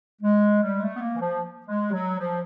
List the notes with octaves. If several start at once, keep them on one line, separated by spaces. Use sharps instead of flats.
G#3
G3
G#3
A3
B3
A#3
E3
F3
G#3
G3
F#3
F3